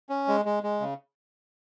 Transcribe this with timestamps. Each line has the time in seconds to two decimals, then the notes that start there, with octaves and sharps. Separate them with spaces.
0.10 C#4
0.28 G#3
0.45 G#3
0.63 G#3
0.80 C#3